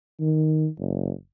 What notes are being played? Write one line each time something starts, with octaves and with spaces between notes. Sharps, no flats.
D#3
F#1